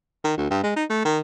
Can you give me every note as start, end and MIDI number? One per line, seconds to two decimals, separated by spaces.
0.24 0.37 51
0.37 0.46 38
0.50 0.59 43
0.63 0.75 56
0.76 0.84 63
0.89 1.01 57
1.05 1.19 51